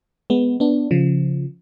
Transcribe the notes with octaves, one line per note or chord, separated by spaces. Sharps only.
G#3 B3
B3 D4
C#3 F3